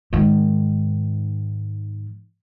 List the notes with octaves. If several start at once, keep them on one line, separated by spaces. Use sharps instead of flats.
G#2 D#3